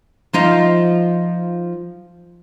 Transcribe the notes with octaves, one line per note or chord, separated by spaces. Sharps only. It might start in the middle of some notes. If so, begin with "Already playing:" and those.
F3 D#4 F4